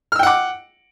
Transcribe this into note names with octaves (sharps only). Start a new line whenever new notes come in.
F#5 G5 D6 E6 F6